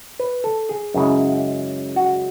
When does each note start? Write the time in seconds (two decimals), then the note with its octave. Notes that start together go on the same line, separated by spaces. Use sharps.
0.19 B4
0.44 A4
0.69 G#4
0.94 F#2 C#3 G#3 C#4 E4
1.96 F#4